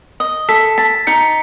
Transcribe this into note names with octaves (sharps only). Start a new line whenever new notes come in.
D#5
A4 B6
A5 B6
D#4 C#7